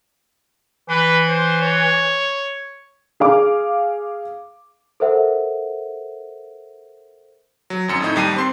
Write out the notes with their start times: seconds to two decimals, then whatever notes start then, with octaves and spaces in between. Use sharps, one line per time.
0.89 E3 B4
1.29 C5
1.61 C#5
3.20 G#4 F5 D6
5.00 A4 A#4 C5 E5 F#5
7.70 F#3
7.88 G#1 F#2 C#7
8.00 F2 A2 D#4
8.16 D#2 G3 C7 D#7
8.36 C4 C6 C7